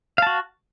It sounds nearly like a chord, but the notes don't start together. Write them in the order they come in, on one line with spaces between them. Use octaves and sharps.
F5 A5 F#4